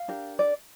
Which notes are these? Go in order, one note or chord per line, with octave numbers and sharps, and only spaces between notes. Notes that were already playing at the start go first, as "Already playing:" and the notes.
Already playing: F5
D4 G4 A#4
D5